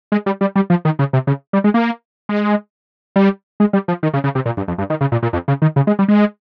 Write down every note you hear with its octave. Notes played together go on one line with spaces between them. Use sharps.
G#3
G3
G3
G3
F3
D#3
C#3
C3
C#3
G3
G#3
A#3
G#3
G3
G#3
G3
F3
D#3
C#3
C#3
C3
A#2
G2
F2
G2
D#3
C#3
A#2
A#2
F2
C#3
D#3
C#3
G#3
G3
G#3